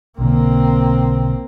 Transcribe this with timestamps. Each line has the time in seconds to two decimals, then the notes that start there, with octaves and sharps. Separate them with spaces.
0.19 B1 D3 A#3 C4